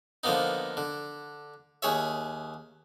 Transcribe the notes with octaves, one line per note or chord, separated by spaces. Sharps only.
D3 F3 A#3 B3 D#4
D3
D#2 G#4 C#5 E5